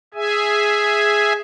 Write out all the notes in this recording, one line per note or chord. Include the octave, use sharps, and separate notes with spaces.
G#4 E5 G#5